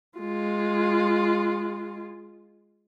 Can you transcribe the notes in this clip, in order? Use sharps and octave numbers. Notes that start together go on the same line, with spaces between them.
G#3 F4